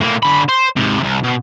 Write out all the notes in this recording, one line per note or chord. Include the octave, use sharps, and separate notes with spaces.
A2 A#3
D3 B5
C5
G#2 C3
C2 C3
B2